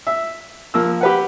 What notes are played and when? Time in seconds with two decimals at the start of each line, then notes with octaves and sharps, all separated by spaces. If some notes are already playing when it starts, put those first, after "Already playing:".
0.07 E5
0.74 F3 A#3 E6
1.01 G4 B4 F#5